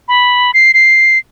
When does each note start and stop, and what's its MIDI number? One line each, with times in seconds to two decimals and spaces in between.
0.08 0.51 83
0.54 0.72 96
0.74 1.18 96